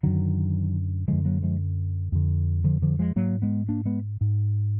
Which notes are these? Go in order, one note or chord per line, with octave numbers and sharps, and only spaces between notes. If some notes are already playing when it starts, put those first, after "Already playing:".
F#2 D3 D#3 F#3
F#2 D3 F3 G#3
F#3 A#3
F3 G#3
F2 D3
D3 F3
D3 F3
F3 G#3
G#2 F#3 A#3
G#3 B3
A#3 D4
G#3 B3
G#2